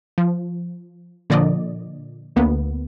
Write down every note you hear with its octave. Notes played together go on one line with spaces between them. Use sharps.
F3
A#2 D3 F3 D5 D#5
D2 A#3 B3